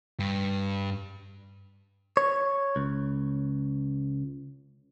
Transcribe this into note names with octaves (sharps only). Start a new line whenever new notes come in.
G2
C#5
C#2